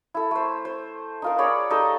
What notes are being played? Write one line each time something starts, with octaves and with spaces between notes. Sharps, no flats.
E4 A4
A3 C5
C5
D#4 F4 A#4
G#4 C#5 D5 B5
G3 D#4 A4